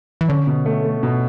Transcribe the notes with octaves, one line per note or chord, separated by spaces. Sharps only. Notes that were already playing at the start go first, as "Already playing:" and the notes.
E3
D3 C#4
B2
A3
A3
B2